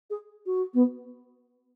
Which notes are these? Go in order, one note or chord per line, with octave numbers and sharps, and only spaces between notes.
G#4
F#4
B3